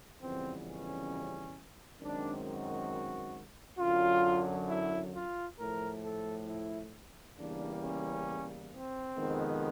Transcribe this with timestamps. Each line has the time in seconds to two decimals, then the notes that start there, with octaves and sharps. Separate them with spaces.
0.21 F2 C#3 E3 G3 B3 C4
0.67 C#4
2.01 F#2 D#3 G#3 C4 D4
2.46 F#4
3.79 F#2 D3 F#3 F4
4.69 E4
5.14 F4
5.58 A2 F3 A3 A#4
6.03 A4
6.47 E4
7.37 E2 C#3 E3 G3 A#3 D4
7.82 C#4
8.72 C4
9.16 F2 C3 D#3 G#3 B3